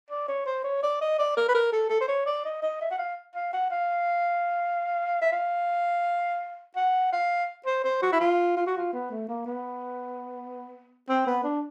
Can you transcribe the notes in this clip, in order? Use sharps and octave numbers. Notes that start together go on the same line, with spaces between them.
D5
C#5
C5
C#5
D5
D#5
D5
A#4
B4
A#4
A4
A4
C5
C#5
D5
D#5
D#5
E5
F#5
F5
F5
F#5
F5
E5
F5
F#5
F5
C5
C5
F#4
E4
F4
F4
F#4
F4
B3
A3
A#3
B3
C4
B3
D4